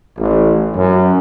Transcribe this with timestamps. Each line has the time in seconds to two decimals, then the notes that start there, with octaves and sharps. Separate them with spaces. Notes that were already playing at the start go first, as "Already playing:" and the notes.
0.17 A1
0.75 F#2